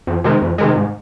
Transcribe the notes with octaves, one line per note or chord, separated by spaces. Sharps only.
F2
C3 D#3 G#3
F2
C3 D#3 G#3
G#2